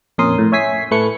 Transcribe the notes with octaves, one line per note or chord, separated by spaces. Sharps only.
F2 A#2 C#4 A#4 C6 D#6
A2
C#5 E5 G#5 B6 C7
A2 A3 B4 C#6 C#7